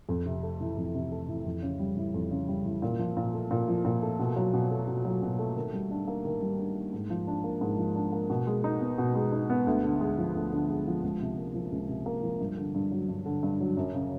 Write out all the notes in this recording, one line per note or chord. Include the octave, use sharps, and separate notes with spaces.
F2
C3
A3
E3
F2
C3
A3
E3
F2
C#3
G3
E3
F2
C#3
G3
E3
A#2
F3
A#2
A3
A#2
F3
A#2
A3
B2
F#3
B2
A3
B2
F#3
B2
A3
D#3
G3
D4
A#3
D#3
G3
D4
A#3
G#2
F3
D4
A#3
G#2
F3
D4
A#3
B2
G#3
D#4
B3
B2
G#3
D#4
B3
D2
D3
G#3
F3
D2
D3
G#3
F3
C#2
C3
A#3
F3
C#2
C3
A#3
F3
G2
D3
G2
F#3
G2
D3
G2
F#3
F#2
C#3